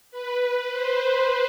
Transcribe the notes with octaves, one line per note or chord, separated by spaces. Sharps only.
B4
C5